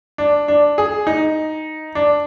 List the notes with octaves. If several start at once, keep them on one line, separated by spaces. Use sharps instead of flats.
D4
D4
G#4
D#4
D4